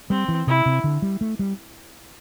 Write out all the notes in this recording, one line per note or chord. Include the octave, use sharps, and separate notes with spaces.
G3 C4
E3
C3 E4
C3
D3
G3
A3
G3